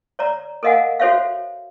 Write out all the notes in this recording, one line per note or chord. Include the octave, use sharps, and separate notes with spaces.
C#5 D5 A#5
A4 A#4 D#5 F5 F#5 G#5
F#4 A4 C5 C#5 E5 F5